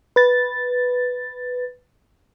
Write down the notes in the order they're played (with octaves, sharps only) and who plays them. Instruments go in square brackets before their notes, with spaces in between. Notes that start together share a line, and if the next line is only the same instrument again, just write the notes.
[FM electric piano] B4 A6